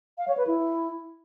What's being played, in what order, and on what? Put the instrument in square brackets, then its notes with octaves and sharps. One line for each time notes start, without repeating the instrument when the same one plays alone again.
[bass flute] F5
C#5
B4
E4